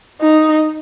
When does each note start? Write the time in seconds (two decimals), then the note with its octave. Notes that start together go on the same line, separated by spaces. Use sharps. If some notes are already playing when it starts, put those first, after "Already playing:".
0.21 D#4